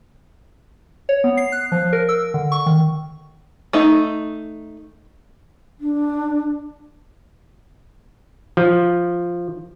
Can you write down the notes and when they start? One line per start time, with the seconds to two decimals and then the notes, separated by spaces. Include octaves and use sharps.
1.09 C#5
1.24 B3
1.37 C7
1.52 F#6
1.72 F3
1.93 A#4
2.09 E6
2.34 D3
2.52 C#6
2.66 D#3
3.73 A3 D#4
5.80 D4
8.57 F3